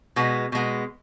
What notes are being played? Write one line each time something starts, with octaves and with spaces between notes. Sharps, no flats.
B2 G#3 B3
B2 G#3 B3